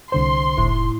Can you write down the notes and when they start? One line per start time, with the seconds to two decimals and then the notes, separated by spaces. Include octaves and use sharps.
0.12 C2 D3 C5 C6
0.57 F1 A2